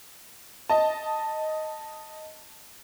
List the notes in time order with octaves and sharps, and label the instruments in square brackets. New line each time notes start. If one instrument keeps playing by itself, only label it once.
[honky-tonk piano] D#5 A5